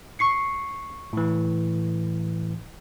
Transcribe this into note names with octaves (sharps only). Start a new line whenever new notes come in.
C#6 C7 C#7
A2 E3